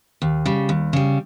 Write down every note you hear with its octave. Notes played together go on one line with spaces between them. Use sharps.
D#2
C#3 G3
D#2
C#3 G3